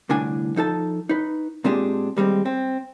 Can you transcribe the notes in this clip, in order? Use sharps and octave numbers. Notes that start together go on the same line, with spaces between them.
C2 A2 D3 D4 G#5
F3 D#4 A4 A5
D#4 B4
A#2 G#3 C4 D4 G4 G#4
D#2 G3 G#3 C4
C4